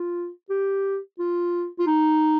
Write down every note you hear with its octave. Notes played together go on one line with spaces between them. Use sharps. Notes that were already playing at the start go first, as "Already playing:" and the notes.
Already playing: F4
G4
F4
F4
D#4